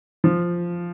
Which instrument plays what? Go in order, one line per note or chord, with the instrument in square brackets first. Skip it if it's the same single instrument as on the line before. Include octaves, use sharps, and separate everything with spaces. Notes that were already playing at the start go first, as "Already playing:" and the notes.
[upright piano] F3